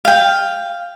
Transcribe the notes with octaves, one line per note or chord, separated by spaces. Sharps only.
F5 G5